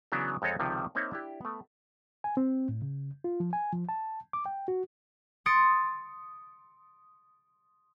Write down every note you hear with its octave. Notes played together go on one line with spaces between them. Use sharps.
C#3 E3 F#3 B3 D4
F2 G#3 C4 A4 C#5 D#5
C#2 C3 D#3 F3
A#3 C4 D#4 C#5 E5
D4 E4 G4
A3 B3
G#5
C4
A2
C#3
F4
F3
G#5
F3
A5
D6
G5
F#4
C6 D#6 A6 C#7 D7